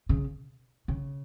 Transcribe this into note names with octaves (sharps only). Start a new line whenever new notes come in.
C#3
C#3